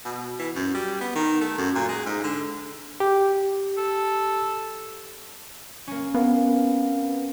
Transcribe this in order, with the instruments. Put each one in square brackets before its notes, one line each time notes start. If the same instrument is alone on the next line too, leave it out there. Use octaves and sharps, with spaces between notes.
[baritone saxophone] B2
E3
F#2
G3
B3
D#3
A3
F#2
A#2
G#3
G#2
D3
[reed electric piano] G4
[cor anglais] A4
[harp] A#3 C#4 [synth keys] C#6
[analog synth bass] B3 [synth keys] C4 A#4 F5